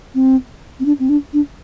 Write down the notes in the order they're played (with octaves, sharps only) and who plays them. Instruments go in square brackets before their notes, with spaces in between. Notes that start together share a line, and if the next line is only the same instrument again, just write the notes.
[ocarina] C4
C4
D4
C4
D4
D4